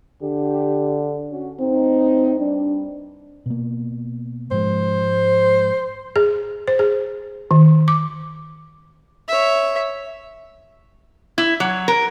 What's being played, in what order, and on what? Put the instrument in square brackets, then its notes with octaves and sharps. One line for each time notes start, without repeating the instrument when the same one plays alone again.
[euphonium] D3 [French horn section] G4
[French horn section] C#4 F#4
[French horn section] A2 D#4 [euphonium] C4
[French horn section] G2 G3 [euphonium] D4
[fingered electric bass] B2 A#3
[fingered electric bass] G#2 F3 G#3 [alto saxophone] C5
[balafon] G#4
C5
G#4
D#3
D6
[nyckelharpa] C#5 E5
[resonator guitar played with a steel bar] E4
F#3
A#4